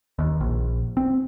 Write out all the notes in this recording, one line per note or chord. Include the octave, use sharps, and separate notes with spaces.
D#2
A#1
C4